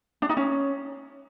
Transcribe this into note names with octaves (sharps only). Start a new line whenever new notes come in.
D4
D#4
C#4